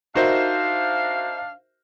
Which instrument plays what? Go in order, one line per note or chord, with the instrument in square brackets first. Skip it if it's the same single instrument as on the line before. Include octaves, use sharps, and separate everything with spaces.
[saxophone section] D4 F5 [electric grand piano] D#4 C5 E5 [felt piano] F#4 A#4